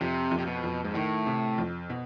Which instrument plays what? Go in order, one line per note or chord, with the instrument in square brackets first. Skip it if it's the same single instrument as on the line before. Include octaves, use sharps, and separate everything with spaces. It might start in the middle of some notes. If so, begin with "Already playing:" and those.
[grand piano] F2 [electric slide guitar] C3
[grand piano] F2
[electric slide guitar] C3
B2
[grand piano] F2
[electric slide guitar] G#2
[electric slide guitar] A2 [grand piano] D#3
[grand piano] C3
F2
B2